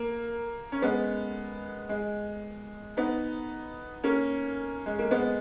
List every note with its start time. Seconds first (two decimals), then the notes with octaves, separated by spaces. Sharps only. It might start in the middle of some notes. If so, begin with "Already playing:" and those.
Already playing: A#3
0.72 C#4
0.82 G#3 B3
1.89 G#3
2.97 B3 D#4
4.04 A#3 C#4
4.86 G#3
4.99 A#3
5.11 G#3 B3